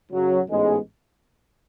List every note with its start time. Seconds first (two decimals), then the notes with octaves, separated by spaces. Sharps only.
0.10 F#2 C#3 F#3
0.47 A1 G#2 G#3 B3